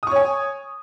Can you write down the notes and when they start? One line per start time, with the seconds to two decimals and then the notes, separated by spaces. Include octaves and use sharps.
0.03 D#6
0.07 C#6
0.11 C#5
0.16 G#5